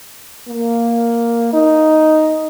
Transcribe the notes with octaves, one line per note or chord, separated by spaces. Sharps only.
A#3
D#4